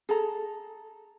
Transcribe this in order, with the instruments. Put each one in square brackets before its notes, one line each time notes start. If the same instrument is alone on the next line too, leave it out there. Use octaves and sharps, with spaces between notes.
[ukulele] G#4 A4 A#5